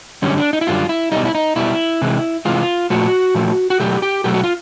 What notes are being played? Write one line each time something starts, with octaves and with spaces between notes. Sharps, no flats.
F#2 D3 G3 C#4
D4
D#4
E4
F#2 D3 G3 F4
E4
B2 G3 D#4
E4
D#4
B2 G3 E4
C3 E3 G#3
C3 E3 G#3 F4
A#2 F3 A3 F#4
A#2 F3 A3
F#4
B2 F#3 A3 G4
G4
B2 F#3 A3 G4
F#4
F4